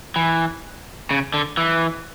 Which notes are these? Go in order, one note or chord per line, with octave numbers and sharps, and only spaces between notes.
E3
C#3
D3
E3